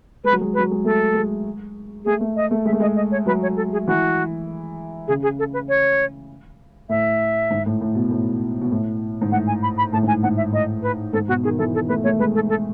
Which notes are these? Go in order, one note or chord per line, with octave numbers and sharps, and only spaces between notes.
G#3 B4
F#3
G#3
F#3 B4
G#3
A3 A4
G#3
A3 G#4
A3
D#5
A3
G#3 E5
A3
G#3 D#5
D#5
C#5
F#3 B4
C#5
A4
G#4
E3 F#4
C#3 G#4
G#4
A4
B4
C#5
A2 E5
G#2
A2
A2
B2
A2
B2
A2
G#2
A2 F#5
G#5
B5
B5
A2 A5
G#2 G#5
G#2 F#5
E5
A2 D#5
B4
G#2 A4
B2 F#4
D#3 G#4
E3 A4
A4
A3 B4
A3 C#5
G#3 B4
A4
A4